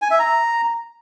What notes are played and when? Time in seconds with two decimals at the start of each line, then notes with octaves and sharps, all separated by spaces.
0.02 G#5
0.11 E5
0.19 A#5